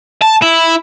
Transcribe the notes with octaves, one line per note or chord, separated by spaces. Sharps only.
A5
E4